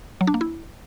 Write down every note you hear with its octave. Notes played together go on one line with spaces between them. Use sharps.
F#3
D4
A#3
E4